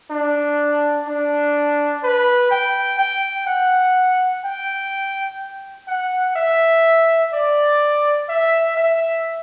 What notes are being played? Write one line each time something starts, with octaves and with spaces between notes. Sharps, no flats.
D4
D4
B4
G5
G5
F#5
G5
F#5
E5
D5
E5
E5